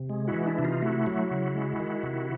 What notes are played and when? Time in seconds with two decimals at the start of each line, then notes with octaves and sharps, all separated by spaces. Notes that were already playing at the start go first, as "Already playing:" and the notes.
Already playing: C3
0.09 G#3
0.28 E4 F#4
0.34 E3
0.46 D4 E4
0.58 C3
0.64 D#4 F4
0.82 A3 E4 F#4
1.06 F#3
1.31 C#3
1.55 G#3
1.80 D#3
2.03 C3